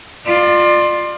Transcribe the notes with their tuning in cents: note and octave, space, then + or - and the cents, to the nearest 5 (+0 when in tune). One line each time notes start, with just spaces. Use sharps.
F4 +10 D5 +35